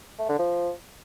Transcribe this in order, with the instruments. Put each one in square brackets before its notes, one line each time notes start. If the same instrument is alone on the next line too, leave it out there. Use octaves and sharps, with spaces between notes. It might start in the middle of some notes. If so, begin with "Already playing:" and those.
[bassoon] A3
D3
F3